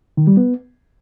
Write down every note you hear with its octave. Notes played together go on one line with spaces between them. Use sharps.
D#3
G3
B3